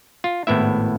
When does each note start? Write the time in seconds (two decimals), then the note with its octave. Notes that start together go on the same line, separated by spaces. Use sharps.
0.24 F4
0.47 G#1 A2 B3 E4 E5